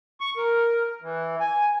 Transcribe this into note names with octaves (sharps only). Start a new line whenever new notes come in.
C#6
A#4
E3
G#5